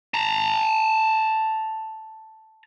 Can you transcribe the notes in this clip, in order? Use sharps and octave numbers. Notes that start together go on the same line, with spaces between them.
A5 A#5